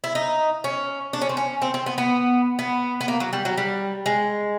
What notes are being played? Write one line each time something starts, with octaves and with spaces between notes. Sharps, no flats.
E4
D#4
C#4
D4
C#4
C4
C#4
C4
C4
B3
B3
B3
B3
A#3
F#3
G3
F#3
G3
G#3